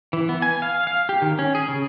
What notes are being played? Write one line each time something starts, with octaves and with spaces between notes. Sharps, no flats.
E3
B3
G#5
F5
F5
G4
D#3
C#4
G#4
C#3